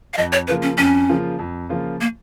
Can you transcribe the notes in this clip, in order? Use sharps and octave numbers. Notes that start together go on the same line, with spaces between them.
F5
F2 D#5
C#5
C#3 F3 A#3 F4 B4
C#4
F2 C#4
C#3 F3 A#3 F4
F2
C#3 F3 A#3 F4
A#3